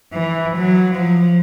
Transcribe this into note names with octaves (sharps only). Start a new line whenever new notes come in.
E3
F#3
F3